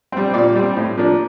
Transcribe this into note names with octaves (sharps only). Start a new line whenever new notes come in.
G3 C4
A#2 D5
G3 C4
A2
F3 A#3 D4